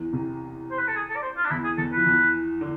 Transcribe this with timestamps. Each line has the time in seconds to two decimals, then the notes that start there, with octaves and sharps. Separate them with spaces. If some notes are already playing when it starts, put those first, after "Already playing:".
Already playing: E2 E3
0.13 C2 C3
0.71 C5
0.79 B4
0.87 A4
0.96 G#4
1.09 A4
1.16 D5
1.23 C5
1.37 F4
1.45 D4
1.50 E2 E3 E4
1.64 G#4
1.78 E2 E3 A4
1.92 F3 B4
2.06 E2 E3
2.61 D3